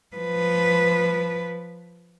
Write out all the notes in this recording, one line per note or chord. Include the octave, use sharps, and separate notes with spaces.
F3 B4